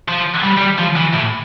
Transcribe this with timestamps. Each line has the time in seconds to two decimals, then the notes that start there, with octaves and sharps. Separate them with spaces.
0.08 F3
0.43 G3
0.58 G3
0.78 F3
0.96 E3
1.14 A2